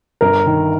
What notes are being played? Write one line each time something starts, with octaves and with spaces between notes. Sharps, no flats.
G1 A#4
D#3